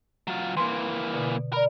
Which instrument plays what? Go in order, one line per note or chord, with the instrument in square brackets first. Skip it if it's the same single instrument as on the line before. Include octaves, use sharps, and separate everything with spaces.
[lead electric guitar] F#3 F4
[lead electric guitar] E3 A#3 [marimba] C6
[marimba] B2 D3
[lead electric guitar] A#4 [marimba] D5 B5